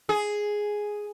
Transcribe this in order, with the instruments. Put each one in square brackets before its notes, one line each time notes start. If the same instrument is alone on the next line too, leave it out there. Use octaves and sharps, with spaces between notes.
[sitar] G#4